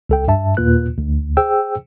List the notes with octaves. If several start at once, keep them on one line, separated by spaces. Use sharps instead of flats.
C#2 A4 G5
G2 E5 A5
D#2 A#2 A#3 F4 B4 F#6
D2
G#4 C5 G5 E6